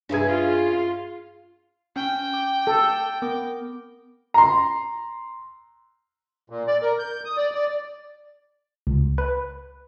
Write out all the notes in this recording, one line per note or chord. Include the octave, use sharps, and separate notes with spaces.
G2 C#4 E4 G#4 B4 G#6
F4
C#4 G5
D6
A4
B3 A#4 D6
A#5 C6
A#2
D5
A#4
G6
D#6
D5
D5
C#2
B4